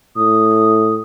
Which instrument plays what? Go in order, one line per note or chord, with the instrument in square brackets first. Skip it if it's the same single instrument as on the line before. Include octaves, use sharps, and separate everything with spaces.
[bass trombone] A2 [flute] D#6